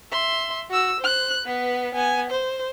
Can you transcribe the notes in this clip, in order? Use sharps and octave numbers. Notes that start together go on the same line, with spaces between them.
E5 C6
F#4 E6
C5 F#6
B3 B4
B3 G#5
C5